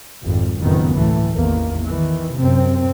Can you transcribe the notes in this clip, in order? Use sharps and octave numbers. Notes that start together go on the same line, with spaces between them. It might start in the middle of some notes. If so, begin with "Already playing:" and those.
G#1 F2 G3
F#1 F2 A2 D#3 B3
D2 A2 E3 A3
A1 E2 D#3 A#3
D#3 E3
F#2 C3 C4